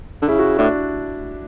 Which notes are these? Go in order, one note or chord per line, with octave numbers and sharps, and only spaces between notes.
D3
C#3 E4
F#4
A2 D4